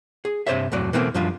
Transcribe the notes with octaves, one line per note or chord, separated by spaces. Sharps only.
G#4
G2 C3 C5 C#5 E5
C2 F2 A2 F#3 D5
B2 E3 A3 A#3 C4
F#2 F3 G3 D4 F4